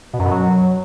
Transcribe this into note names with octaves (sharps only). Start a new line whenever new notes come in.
B2
F#2
B2
F#3